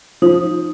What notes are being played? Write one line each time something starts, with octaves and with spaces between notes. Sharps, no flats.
F3 D#4